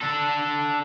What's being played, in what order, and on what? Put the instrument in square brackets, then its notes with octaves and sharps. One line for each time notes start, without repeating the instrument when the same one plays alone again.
[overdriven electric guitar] D4 A4